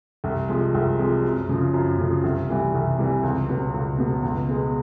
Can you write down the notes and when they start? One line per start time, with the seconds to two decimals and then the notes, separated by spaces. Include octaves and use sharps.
0.24 C2
0.49 C3 F3 G#3
0.74 C2
0.99 C3 F3 G#3
1.24 F#2
1.49 C#3 F3
1.74 F#2
1.99 C#3 F3
2.23 C2
2.48 C3 E3 G3
2.74 C2
2.99 C3 E3 G3
3.23 C#2
3.49 B2 F#3 B3
3.74 C#2
3.98 B2 F#3 B3
4.23 C#2
4.49 B2 G#3 B3